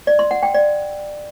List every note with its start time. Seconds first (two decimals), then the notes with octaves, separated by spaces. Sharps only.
0.07 D5
0.19 C6
0.31 F#5
0.43 G5
0.54 D5